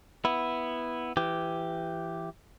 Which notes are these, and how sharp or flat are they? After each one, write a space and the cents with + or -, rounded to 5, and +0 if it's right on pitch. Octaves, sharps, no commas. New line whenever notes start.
B3 +0 E4 +0
E3 +20 G4 +0